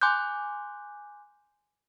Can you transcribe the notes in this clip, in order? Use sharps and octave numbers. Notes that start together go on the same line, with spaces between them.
G#5 C6 D6 F#6 G6